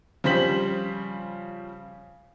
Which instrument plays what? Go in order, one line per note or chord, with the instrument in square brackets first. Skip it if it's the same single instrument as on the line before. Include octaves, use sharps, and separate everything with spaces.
[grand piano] C#3 F3 G3 C5 B6 F#7